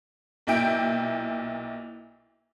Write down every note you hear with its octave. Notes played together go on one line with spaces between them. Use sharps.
B1 A#2 E4 G5 D7